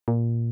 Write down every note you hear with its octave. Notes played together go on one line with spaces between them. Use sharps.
A#2